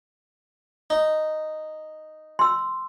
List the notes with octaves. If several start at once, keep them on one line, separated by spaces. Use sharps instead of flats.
D#4
C6 E6